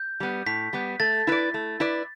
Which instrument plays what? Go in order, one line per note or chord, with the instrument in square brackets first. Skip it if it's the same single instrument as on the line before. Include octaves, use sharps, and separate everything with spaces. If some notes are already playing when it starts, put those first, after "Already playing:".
Already playing: [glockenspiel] G6
[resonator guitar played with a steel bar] G3 B3
[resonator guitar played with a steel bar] A2 [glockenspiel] B6
[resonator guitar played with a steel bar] G3 B3
[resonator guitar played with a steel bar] A3 [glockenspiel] A6
[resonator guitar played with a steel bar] E4 B4 D5
A3
E4 B4 D5